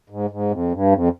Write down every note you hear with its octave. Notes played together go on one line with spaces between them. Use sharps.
G#2
G#2
F2
G2
F2